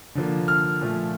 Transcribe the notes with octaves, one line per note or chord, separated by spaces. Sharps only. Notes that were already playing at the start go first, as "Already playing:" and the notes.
D3 F3 A#3
F6
A#2 F3 A3